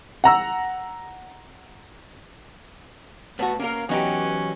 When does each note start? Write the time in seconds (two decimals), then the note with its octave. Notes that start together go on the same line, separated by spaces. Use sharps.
0.24 F#5 A#5 E6
3.39 A2 B3 F#4 B4 A5
3.59 A#3 C#4 A#4 F5
3.89 E3 F#3 B3 C#4 D#4 G4